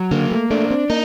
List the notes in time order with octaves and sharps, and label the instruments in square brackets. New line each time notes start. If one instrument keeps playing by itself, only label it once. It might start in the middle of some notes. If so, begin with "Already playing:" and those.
Already playing: [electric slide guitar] F#3
[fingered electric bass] D3 [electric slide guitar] A#3
[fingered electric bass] A3
[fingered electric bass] A3 [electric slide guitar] D4
[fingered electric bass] C4
[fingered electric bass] A#3 [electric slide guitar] D#4